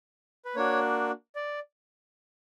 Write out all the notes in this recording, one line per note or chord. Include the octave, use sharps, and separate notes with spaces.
B4
A#3 D4 F#4 C#5
D5